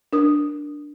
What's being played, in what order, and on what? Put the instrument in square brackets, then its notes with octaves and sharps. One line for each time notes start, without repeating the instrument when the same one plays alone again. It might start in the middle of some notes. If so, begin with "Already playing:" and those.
[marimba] D4 A#4 D#6